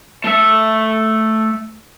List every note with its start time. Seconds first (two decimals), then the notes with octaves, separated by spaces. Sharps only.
0.24 A3 E5